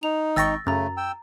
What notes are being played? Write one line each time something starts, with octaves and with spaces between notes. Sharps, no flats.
D#4 F7
G#1 G5 C#6 E6 A6 A#6
F#2 C#3 A3 A#5 A6
G5 E6